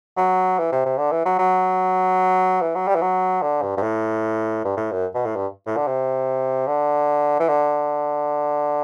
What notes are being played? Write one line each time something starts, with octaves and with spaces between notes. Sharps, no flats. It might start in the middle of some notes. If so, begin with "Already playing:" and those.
F#3
E3
C3
C3
D3
E3
F#3
F#3
E3
F#3
G3
E3
F#3
D3
G2
G2
A2
G2
A2
F#2
B2
A2
G2
A2
D3
C3
D3
E3
D3